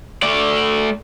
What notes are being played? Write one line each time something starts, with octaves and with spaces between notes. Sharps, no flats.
A3 D5